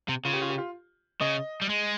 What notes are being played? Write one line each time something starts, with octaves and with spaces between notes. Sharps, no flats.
C3
C#3 F4
G4
F4
G4
F4
C#3 D#5
G3
G#3